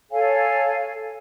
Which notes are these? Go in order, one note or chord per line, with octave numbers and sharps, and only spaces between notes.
A4 C#5 F5 G#5